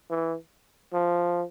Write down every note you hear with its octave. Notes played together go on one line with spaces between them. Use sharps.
E3
F3